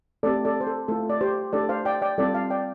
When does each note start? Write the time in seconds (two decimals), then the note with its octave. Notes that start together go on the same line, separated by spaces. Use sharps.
0.23 A3 C4 G4 A4 D5
0.45 A4 D5
0.61 C5
0.67 A4
0.88 A3 F4 A4
1.10 D5
1.21 G4 C5
1.53 A3 D4 G4 A4 D5
1.69 C5 F5
1.85 D5 G5
2.02 D5 G5
2.18 G3 C4 F4 A4 D5
2.34 F5 A5
2.50 D5 G5